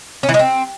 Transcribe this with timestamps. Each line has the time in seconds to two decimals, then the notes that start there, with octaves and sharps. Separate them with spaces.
0.23 C#4
0.29 E3
0.34 G#3
0.39 C4